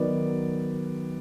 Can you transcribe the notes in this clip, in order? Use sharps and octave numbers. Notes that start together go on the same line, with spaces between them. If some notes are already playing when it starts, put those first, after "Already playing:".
Already playing: D#3 F#3 B3 D#4 D5